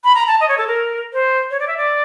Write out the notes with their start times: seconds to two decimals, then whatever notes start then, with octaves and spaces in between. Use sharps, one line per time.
0.04 B5
0.15 A#5
0.27 A5
0.41 D#5
0.49 C#5
0.58 A4
0.68 A#4
1.13 C5
1.51 C#5
1.60 D5
1.68 E5
1.77 D5